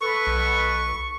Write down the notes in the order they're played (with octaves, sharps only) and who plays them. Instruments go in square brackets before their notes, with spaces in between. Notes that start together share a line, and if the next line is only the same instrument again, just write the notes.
[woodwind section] A4 B4 [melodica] C#6
[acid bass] B1